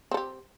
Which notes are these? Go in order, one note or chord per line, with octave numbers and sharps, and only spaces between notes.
C4 G4 A4